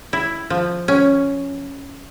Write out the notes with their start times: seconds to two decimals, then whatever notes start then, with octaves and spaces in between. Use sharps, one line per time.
0.13 E4
0.50 F3
0.88 C#4